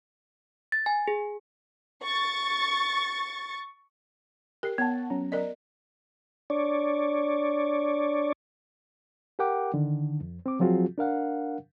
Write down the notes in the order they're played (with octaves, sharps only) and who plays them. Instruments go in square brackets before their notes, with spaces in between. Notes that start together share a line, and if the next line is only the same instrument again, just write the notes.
[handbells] A6
G#5
G#4
[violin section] C#6 A6
[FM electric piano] G4 C7 [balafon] A#4
[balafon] B3 [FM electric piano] C#5 F#5 A5
[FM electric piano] F#3 C#4 A#5
[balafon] A#4 D5 D#5
[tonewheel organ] D4 C#5 D5
[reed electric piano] G4 A#4 F#5 G5 D6
D3 D#3
F2
C4 D6
F3 F#3 C4 F4 F#4 G#4
D4 A#4 F5 F#5